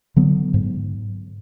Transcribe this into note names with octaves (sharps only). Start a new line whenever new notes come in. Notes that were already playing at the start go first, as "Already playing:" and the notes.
D3 F#3 B3
G#2